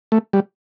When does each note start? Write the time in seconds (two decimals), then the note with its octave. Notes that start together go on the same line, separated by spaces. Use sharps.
0.12 A3
0.33 G3